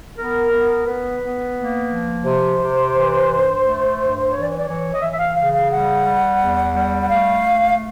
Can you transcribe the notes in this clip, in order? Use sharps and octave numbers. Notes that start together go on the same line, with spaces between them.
B3 A#4
B3
B3 B4
B3
A#3
F3
C3 C5
C3
E3
G2
A3
G2
E3 C#5
D5
C#5
D5
E3 C#5
D#5
E3 E5
E5
F5
C#3 F5
F5
G3 F#5
G3
E2
G3
F#5
A3 F5